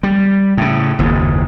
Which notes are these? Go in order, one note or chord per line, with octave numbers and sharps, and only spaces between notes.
G3
A2 C#3
F#1 D#2 G#2